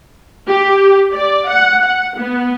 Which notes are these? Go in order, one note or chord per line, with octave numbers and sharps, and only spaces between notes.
G4
D5
F#5
F#5
B3